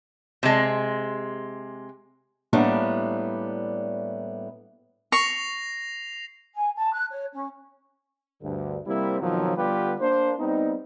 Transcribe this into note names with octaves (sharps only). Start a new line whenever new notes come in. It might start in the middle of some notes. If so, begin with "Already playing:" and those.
C3 G#3
A2 G3 A#3 B3 D4
C#6 A#6 C7 F7
G#5
A5
F#6
C#5
C#4
D2 G2 D3
C3 G3 A#3 C4 E4
F2 B2 D#3 F3 F#3
D3 G3 B3 F4 G4 B4
A#3 D4 C5
G3 B3 C4 D#4